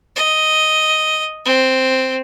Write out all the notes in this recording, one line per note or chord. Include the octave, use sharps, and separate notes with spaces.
D#5
C4